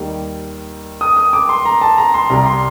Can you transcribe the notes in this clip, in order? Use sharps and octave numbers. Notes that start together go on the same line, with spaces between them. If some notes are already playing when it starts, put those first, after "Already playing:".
Already playing: D#2 D#3 G3
D#6
D#6
D6
C6
A#5
A5
A#5
C6
C2 C3 G3 A#5
C6